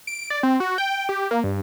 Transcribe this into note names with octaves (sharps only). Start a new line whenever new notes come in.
D7
D5
C4
F#4
G5
G4
A#3
G2